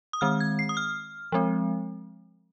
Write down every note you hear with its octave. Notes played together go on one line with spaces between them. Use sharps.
D#6
D#3 G#3 C4 F6
G#6
C7
D#6
F6
F3 G#3 C4